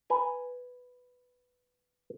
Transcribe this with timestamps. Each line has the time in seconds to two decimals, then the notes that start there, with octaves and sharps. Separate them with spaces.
0.10 B4 G#5 A#5